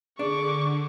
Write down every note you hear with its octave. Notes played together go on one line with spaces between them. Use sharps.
D3 D4 G#4 C#6 D6